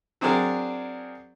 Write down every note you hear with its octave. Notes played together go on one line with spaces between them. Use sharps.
F#3 C4 D4 G#4 A#4 D5